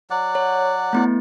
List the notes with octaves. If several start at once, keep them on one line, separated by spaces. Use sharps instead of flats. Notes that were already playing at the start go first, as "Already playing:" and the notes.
F#3 D5 F#5
C#5
A3 B3 E4